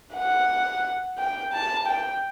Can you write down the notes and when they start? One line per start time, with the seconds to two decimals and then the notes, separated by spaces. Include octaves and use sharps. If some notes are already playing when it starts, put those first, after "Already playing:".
0.15 F#5
1.18 G5
1.53 A5
1.87 G5